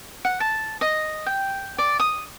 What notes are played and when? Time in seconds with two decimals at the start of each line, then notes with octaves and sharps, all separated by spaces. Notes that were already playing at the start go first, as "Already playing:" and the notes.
0.25 F#5
0.40 A5
0.81 D#5
1.26 G5
1.78 D5
2.00 D#6